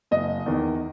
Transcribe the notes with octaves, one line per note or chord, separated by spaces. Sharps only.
F#1 D#5
E2 D#3